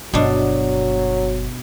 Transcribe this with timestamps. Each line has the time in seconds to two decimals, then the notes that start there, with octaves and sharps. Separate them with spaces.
0.14 G1 B2 F#3 D4